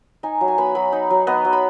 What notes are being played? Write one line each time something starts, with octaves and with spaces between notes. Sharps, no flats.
D#4 G#5
F#3
G#5
B3 B5
F#3 B5
D#4
F#3
B3 D#5
F#3
B5